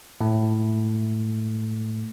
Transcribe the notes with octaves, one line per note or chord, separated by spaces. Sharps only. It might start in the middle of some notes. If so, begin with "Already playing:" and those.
A2 A3